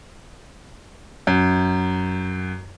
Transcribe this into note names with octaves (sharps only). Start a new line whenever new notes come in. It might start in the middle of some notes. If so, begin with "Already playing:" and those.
F#2